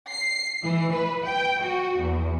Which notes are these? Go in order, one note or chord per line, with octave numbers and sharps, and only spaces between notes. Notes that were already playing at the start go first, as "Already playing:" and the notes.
C7
E3
B4
G5
F#4
E2